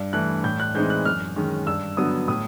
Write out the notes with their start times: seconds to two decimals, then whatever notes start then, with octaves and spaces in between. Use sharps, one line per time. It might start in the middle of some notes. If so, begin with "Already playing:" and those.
Already playing: G2
0.13 E3 A3 F#6
0.44 A2 G6
0.60 F#6
0.74 E3 G#3 C4 D#4 G6
0.90 F#6
1.05 F#2 F6
1.36 D#3 G#3 C#4
1.67 G2 E6
1.97 D3 F#3 B3 D#6
2.28 A2 D#6